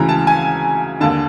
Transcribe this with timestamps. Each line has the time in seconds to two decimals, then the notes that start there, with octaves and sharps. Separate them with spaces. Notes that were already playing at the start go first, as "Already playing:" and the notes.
Already playing: D2 C#3 E3 A#5
0.09 A5
0.27 G#5
1.01 D#2 D3 A5